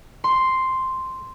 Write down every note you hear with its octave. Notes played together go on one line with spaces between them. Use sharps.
C6